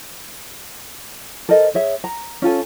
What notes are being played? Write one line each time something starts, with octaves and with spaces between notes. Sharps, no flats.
A4 A#4 C5 D#5
G#4 C#5 E5
A#5
C#4 F4 A4 G#5